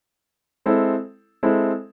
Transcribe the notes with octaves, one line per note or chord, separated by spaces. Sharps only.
G#3 C4 E4 A4
G#3 C4 E4 A4